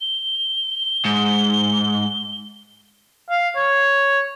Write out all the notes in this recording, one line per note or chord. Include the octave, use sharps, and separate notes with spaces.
G7
G#2
F5
C#5